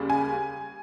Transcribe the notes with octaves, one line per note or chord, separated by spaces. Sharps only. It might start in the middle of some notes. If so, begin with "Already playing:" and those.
Already playing: D#2 C#3 G3
G#5